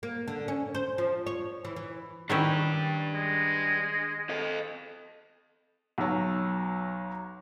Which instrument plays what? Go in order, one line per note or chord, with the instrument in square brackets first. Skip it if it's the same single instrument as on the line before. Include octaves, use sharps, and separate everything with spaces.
[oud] A#3
D3
C#4
C5
F3
C#5
E3
E3
[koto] D#3 C#4 E4 [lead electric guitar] D4 G4
[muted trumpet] G#3
[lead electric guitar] A4 D#5
[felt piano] B1 F#3